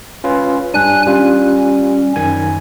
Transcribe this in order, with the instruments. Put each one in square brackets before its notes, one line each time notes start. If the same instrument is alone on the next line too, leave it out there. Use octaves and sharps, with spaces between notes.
[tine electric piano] C#4 F4 B4
[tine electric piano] G2 G3 D4 [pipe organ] G#5 F#6
[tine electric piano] G3 F4 [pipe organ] C#4
[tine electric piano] F#2 D#3 G#5